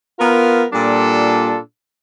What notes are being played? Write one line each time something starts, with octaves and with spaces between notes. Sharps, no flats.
B3 F4 A#4
A#2 G3 D4 F4 A4